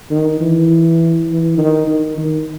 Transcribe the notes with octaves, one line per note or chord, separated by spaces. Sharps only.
D#3
E3
E3
D#3
D#3
D#3